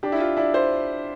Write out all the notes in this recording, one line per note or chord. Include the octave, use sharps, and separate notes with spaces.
D4 G4
E4
F4
D4 E4
C5